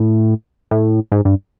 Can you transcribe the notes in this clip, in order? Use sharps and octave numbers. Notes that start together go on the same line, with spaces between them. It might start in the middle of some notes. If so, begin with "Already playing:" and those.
Already playing: A2
A2
G#2
G2